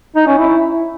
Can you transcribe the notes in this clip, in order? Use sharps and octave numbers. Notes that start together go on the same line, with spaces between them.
D#4
C#4
E4